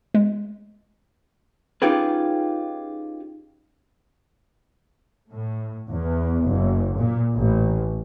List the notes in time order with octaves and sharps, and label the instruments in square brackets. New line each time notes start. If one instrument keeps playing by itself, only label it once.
[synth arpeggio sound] G#3
[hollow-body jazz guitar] C#4 D#4 F4 G4 G#4 B4
[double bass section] A2
E2
F#1
A#2
A1